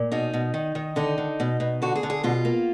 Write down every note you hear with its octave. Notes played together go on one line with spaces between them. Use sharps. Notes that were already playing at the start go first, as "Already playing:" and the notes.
Already playing: A#2
B2 D#4
B2
D#3
D#3
D3 D#4
D3
B2
B2
D3 F#4
G#4
D3
G#4
B2 F4
A#3